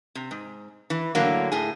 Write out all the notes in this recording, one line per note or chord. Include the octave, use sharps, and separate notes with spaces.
C3
G#2
E3
A2 D3 F#3 A#3
A2 G#4